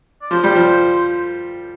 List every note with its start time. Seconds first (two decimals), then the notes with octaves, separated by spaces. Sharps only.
0.22 D5
0.31 F3 C5
0.44 G3
0.55 F3